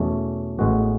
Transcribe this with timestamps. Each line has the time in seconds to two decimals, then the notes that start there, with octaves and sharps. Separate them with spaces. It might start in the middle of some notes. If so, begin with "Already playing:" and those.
Already playing: E2 B2 A3 C#4
0.59 A1 A2 G#3 B3 F#4